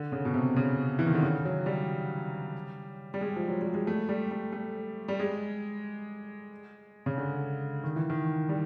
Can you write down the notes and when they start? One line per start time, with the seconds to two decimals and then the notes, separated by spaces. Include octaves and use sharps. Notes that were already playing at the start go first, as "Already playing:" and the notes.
Already playing: D3
0.12 C#3
0.25 B2
0.34 C3
0.56 C#3
0.99 E3
1.06 D#3
1.14 D3
1.23 C#3
1.45 F#3
1.66 G3
3.14 G3
3.21 G#3
3.36 F3
3.48 F#3
3.61 G3
3.74 G#3
3.87 A3
4.09 G3
4.31 A3
4.53 A3
5.08 G3
5.20 G#3
7.06 C#3
7.18 D3
7.84 D#3
7.96 E3
8.10 D#3
8.49 G3